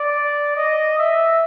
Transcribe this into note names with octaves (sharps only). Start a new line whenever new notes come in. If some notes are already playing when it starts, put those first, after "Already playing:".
Already playing: D5
D#5
E5